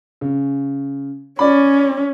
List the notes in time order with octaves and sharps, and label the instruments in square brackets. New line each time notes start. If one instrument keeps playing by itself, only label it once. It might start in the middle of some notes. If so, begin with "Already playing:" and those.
[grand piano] C#3
[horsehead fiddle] C#4 [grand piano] D5 B5